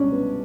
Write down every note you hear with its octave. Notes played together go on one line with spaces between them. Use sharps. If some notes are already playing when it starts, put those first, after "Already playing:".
Already playing: C#2 B2 G3 C#4 D4
B3